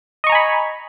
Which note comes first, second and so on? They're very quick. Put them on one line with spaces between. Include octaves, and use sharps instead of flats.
D#5 C#6 A#5 G#5 B5